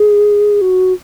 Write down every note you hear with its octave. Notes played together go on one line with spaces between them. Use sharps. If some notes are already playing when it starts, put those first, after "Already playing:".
Already playing: G#4
F#4